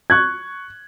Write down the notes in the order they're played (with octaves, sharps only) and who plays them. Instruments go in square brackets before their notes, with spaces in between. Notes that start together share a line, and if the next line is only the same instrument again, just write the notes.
[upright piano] C#6 F#6 G#6